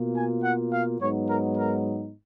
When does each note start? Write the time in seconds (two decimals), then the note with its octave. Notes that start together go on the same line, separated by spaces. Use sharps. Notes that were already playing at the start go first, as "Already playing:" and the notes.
Already playing: B2 A#3 F4
0.16 G#5
0.43 F#5
0.72 F5
1.00 G#2 F#3 B3 D#4 C#5
1.28 A#4
1.57 A#4